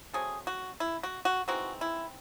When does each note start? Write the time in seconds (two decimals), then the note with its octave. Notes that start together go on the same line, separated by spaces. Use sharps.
0.13 F#3 A3 C4 G#4
0.47 F#4
0.80 E4
1.03 F#4
1.25 F#4
1.48 E3 G#3 C4 D#4 F#4
1.81 E4